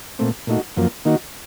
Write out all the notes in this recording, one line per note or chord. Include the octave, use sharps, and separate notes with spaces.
A#2 A3 C4
A#2 A3 D#4 F#4
F#2 F3 A#3
D#3 A#3 D#4 F#4